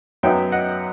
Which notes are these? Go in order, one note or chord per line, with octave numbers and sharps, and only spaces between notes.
F#2 F#3 B3 D#4 E5 G5
D#5 F#5